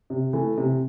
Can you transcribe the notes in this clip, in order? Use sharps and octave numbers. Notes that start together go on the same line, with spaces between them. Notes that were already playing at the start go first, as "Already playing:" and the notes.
C3
E3 A3
C3